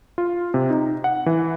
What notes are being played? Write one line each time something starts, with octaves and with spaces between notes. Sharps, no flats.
F4
C3
D#4
F#5
E3